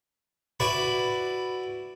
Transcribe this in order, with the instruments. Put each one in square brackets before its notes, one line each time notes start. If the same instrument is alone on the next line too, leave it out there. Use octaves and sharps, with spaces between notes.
[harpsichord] E4 F#4 B4 D5 B5